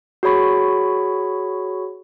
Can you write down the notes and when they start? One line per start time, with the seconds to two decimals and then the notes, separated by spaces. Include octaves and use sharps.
0.23 F#4 G#4 C#5 B5 C#6